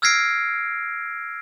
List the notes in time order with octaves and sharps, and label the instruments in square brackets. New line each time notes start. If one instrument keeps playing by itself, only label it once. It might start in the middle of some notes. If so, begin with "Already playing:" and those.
[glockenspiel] E6 F6 G#6 A#6 C7 D7